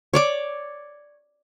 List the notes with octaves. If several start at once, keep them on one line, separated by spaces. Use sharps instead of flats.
C#5 D5 D6